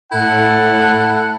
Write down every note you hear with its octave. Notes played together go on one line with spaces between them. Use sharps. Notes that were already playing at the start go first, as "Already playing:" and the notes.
A2 E4 A4 F#5